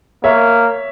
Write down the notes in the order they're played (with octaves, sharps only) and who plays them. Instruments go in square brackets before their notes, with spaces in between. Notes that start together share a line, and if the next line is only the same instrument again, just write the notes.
[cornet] A#3 [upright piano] C#5 E5